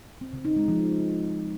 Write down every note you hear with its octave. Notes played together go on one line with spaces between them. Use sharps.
C4
C#3
D#4
G#3
F3